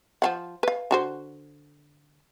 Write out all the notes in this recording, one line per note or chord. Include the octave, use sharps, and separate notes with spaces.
F3 F5 F#5
B4 F5
D3 F#4 C5